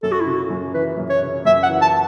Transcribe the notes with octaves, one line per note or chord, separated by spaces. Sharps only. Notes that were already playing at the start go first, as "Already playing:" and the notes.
F#2 A4
F#4
E4
C#3 F#4
F#2
E3 B4
F#2
C#5
C#3
F#2 E5
F#5
E3
A5